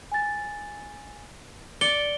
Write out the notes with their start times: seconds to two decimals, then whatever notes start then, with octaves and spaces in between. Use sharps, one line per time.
0.12 G#5 A6
1.81 D5 C#7 G7